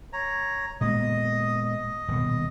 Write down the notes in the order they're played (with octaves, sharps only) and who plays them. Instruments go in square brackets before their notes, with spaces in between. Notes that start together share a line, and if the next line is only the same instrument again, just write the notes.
[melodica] C#5 A#5
[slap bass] A#2 G#3 B3 [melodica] D#5
[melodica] D#5
[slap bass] D#1 B2